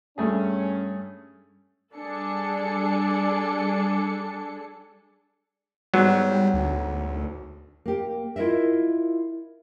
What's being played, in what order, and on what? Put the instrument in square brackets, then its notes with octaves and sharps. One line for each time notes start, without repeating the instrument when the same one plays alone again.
[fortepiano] G2 A3 G#4 [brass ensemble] C#4
[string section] G3 D4 G#4 A4 C#7
[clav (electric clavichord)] G#2 F#3 B3 [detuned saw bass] G3
[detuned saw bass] D2
[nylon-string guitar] A#3 G4
E4 F4 A#4 D#5 E5